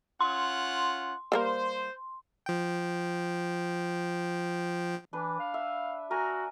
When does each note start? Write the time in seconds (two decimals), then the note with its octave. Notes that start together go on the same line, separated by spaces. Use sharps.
0.21 C#4 F4 F#5 C6
1.32 G3 A#3 A#4 C5
2.46 F3 G5
5.13 E3 D4 B4
5.40 F5
5.54 E5
6.11 F#4 A#4 G#5